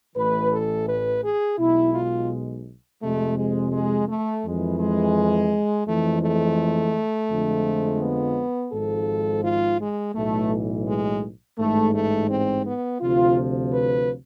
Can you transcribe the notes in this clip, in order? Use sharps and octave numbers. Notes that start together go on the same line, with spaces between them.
A1 A2 E3 B4
A4
B4
G#4
B1 B2 G#3 E4
F4
F2 C3 G#3 A3
G#3
G#3
A3
F2 E3 G#3
G#3
F2 E3 G#3 A3
A3
F2 D3 F3 G#3
B3
G#1 G#2 F3 A4
F4
G#3
B1 A2 E3 A3
G#3
A1 G#2 G#3 A3
A3
C4
B3
D2 C3 F3 F4
B4